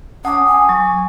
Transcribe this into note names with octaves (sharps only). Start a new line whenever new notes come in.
C#4 F#5 A5 D6 D#6
G#5
F#3 C#6